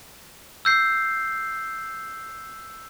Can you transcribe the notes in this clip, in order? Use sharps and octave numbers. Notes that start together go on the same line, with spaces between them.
E6 G6 C7